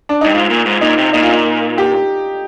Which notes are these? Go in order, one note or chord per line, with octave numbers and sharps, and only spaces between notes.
D4
G2 D#4
G#2 F4
A#2
G#2
A#2 D#4
C3
A#2 D#4
F4
D#4
G4